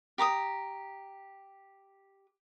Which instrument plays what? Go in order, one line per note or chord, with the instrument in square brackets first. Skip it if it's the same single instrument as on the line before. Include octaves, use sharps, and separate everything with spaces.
[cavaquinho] G4 A#5 D6 D#6